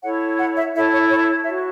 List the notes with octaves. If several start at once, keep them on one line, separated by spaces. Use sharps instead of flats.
E4 A4 C#5 F#5
F#5
E5
E4 A4 C#5 E5
C#5
C#5
F#4 C#5 E5